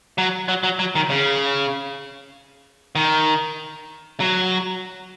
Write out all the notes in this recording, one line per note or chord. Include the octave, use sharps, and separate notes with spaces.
F#3
F#3
F#3
F#3
D#3
C#3
D#3
F#3